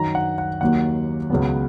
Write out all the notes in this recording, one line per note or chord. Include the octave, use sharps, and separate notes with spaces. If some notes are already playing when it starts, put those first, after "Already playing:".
Already playing: F#2 D#3 F#3 A#5
F#5
F#5
D#2 D#3 F#3 A#3 F#5
C#2 C#3 F#3 B3